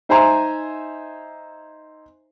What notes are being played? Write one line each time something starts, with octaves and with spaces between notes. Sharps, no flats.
D#4 C5 E5 G#5 A#5 C6